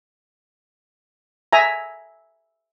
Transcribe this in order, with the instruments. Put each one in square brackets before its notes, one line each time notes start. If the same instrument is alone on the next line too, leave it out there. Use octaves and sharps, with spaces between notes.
[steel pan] E5 G#5 A#5